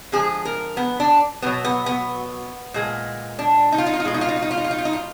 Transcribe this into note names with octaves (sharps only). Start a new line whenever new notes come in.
D3 F3 G#3 G#4
A#4
B3
D4
B2 F#3 B3
B3
B3
A#2 G#3
D4
D#4
F4
D#4
F4
D#4
B2 G#3 F4
D#4
F4
D#4
F4
D#4
F4
D#4
F4
D#4
F4
D#4
F4